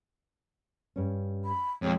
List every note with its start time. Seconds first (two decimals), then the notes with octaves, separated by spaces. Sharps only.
0.96 G2 C#4
1.45 B5
1.82 F2 B2 G#3 C4 C#5